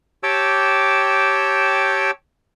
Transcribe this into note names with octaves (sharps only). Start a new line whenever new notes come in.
G4 C#5 G5 A5 D6 E6